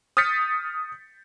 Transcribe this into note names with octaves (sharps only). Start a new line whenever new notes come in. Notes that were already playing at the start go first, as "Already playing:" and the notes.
D#6 F6 G6 A6 B6 C#7